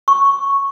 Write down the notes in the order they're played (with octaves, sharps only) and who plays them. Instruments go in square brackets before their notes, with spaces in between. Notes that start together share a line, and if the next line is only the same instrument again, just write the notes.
[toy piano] C#6